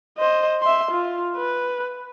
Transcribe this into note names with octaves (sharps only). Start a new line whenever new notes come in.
C5 D#5
E5 C6
F4
B4